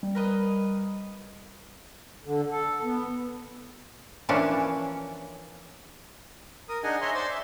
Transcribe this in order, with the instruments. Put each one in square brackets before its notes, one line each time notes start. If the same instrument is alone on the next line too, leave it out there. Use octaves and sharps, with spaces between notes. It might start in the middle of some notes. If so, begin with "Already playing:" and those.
[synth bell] G3
[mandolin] A#4 B4 D#5
[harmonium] D3
A4
B3
[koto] E3 F3 A#3 C#4 D4
[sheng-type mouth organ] A#4 D#6
D4 D#4 G#4 D#5 F#5 G#5
C#5 D#5 E5 G#5 A#5 C6
C5 D5 C6
E5